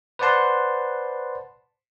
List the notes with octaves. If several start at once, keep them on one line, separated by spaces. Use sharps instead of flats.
B4 C5 D5 F#5 A5 C6